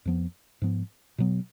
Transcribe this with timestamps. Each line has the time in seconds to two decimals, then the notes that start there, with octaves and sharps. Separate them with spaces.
0.05 F2 F3 B3
0.62 G#2 F3 B3
1.18 B2 F#3 B3